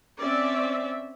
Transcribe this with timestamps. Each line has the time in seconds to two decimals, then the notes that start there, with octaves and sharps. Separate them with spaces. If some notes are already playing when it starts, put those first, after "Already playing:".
0.20 C4 C#4 D5 E5